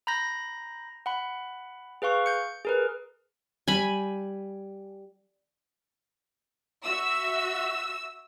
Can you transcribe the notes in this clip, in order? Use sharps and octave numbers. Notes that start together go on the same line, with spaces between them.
A#5 B5 G6 A#6
F#5 B5
G#4 B4 F5 C#6
G6 C#7
G#4 A#4 B4
G3 G#5 B5
F#4 E5 E6